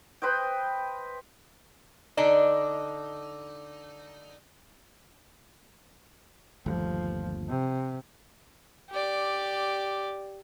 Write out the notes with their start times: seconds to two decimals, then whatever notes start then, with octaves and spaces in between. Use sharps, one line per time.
0.22 B4 C5 D#5 G5
2.17 D3 D4 D#4
6.66 G1 D#2 F3 A3
7.49 C3
8.90 G4 D5